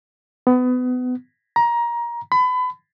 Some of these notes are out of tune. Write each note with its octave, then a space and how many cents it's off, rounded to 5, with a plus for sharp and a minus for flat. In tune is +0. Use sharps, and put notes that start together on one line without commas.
B3 +25
A#5 +20
B5 +30